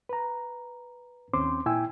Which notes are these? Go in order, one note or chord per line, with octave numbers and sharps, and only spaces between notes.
B4 A#5
D#2 C4 C#4 C5 C6 D6
A#2 E4 G5 G#5 E6